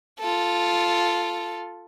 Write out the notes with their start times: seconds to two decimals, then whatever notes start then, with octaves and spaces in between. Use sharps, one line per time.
0.20 F4 A4